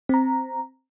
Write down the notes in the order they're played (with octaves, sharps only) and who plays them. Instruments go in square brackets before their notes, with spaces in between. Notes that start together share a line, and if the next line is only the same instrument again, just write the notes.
[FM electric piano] C4 A#5